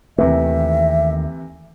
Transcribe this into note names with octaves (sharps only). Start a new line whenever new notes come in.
D#2 C3 D#3 E3 A3 E5